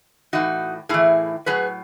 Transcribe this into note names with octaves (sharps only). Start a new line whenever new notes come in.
A2 E3 D#4 F#4
A2 E3 E4 G#4
A2 F#3 G#4 B4